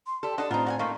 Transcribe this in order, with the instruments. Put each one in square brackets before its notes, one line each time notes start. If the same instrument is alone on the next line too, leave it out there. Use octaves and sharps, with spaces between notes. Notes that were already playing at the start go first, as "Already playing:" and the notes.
[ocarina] C6
[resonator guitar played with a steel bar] G4 A4 [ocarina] D5
[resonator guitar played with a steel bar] D4 A4 [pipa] F#4 D#5 C6 [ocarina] D5
[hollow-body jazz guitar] A2 C4 [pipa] B3 D#4 [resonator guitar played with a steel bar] F4 [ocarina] A#5
[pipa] F#4 F#5 G#5 [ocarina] D5
[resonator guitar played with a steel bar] A3 A#3 [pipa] D#4 F4 [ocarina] C#6